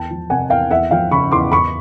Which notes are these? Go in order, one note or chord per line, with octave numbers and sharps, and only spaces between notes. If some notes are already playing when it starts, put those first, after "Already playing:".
Already playing: E2 G5 A5
F3
C3 F#5 G#5
E2 F5 G5
E2 E5 F#5
F3 F5 G5
C#3 B5 C#6
E2 C6 D6
E2 B5 C#6